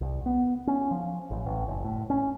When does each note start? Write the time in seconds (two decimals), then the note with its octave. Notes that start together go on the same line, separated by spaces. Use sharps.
0.01 C2
0.26 B3
0.67 C#4
0.91 F3
1.31 A1
1.46 A1
1.68 F#1
1.84 A2
2.10 C#4